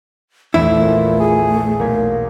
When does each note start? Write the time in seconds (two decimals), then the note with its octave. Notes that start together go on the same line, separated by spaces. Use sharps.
0.54 A#1 E2 A3 E4
0.81 A#2
1.20 G#4
1.79 B1 A#3 G#6 B6